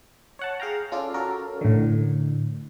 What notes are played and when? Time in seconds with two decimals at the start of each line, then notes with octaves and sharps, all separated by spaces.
0.39 C#5 F#5 A5
0.60 G#4 F5 G5 A#5
0.92 C#4 F4 A4 D5
1.14 C#4 F#4 A4 A#4
1.61 A2 D3